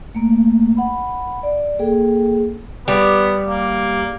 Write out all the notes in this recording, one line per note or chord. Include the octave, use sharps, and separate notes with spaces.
A3 A#3
F#5 B5
D5
A#3 G#4 A4 G5
G3 B3
A#3